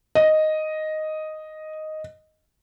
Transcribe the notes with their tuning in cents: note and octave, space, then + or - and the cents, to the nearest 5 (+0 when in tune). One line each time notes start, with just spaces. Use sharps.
D#5 +0